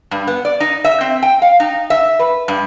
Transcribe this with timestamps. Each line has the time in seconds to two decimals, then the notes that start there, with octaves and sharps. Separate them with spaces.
0.11 G2
0.27 B3
0.45 D5
0.60 D#4
0.85 E5
1.01 C4
1.23 G5
1.42 F5
1.60 D#4
1.90 E5
2.19 B4
2.48 G2